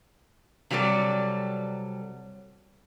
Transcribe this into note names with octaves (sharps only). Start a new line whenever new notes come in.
C3 F#3 G3 A4 D5